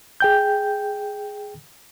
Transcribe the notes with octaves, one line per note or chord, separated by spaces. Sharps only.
G#4 G5 G6